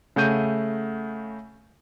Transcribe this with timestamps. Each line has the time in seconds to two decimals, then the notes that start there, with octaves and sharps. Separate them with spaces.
0.16 C#3 A3 F#5 G6 D#7